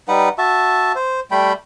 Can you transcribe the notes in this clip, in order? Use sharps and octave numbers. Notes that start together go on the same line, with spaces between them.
G3 D#4 B4 F#5
F#4 E5 A5
C5
G3 A3 G5 B5